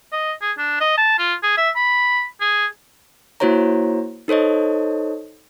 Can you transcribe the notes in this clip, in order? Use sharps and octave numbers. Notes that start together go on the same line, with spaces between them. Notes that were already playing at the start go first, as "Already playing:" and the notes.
D#5
G#4
D4
D#5
A5
F4
G#4
E5
B5
G#4
A#3 E4 F#4 C5 C#5 A#5
D#4 A4 C5 C#5 D#5